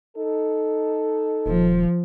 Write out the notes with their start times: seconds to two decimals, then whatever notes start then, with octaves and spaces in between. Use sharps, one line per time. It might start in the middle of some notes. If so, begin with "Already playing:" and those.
0.17 D#4 A4
1.46 D#1 F3